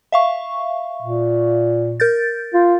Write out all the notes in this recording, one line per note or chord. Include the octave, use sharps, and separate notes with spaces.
E5 F5 C#6
A#2
A#4 G6 A6
F4